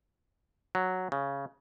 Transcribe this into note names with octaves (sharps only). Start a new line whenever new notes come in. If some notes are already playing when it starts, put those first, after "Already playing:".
F#3
C#3